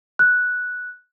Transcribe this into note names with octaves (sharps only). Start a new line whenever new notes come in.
F#6